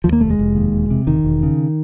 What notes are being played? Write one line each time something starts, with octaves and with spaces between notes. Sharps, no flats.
D#2 F3
A#3
F1 A3
G#3
F1
D#2
E1
C3
E1 D#3
E1
C#3